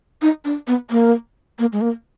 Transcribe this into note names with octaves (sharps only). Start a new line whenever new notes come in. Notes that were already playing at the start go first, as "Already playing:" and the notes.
D#4
D4
B3
A#3
A#3
G#3
A#3